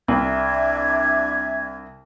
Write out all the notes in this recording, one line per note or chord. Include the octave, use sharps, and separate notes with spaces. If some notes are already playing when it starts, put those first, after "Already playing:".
C2 D4 E5 G#6